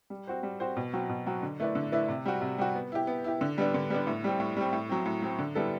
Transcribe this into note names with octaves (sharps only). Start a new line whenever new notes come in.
G3
C4 F#4 C5
G3
C4 F#4 C5
B2
F#3 C4 F#4
B2
F#3 C4 F#4
D3
A3 E4 B4 D5
D3
A3 E4 B4 D5
C3
G3 C4 F#4
C3
G3 C4 F#4
B3
E4 G4
B3
E4 G4
D3
G3 B3 D4
D3
G3 B3 D4
A2
G3 C4
A2
G3 C4
A2
F#3 C4
A2
F#3 C4
D3
G3 B3 E4 A4